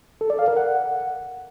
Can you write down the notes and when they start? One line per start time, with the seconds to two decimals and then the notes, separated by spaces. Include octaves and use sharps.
0.21 A4
0.30 D5
0.39 F5
0.48 A#4
0.57 F#5